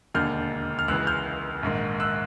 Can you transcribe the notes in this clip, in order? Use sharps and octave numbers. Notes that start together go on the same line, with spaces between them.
E1 D#2 D3 F6 G6
F6
C#2 C#3 E3 E6 F#6
F6 G6
A#1 G#2 D#3
E6 F#6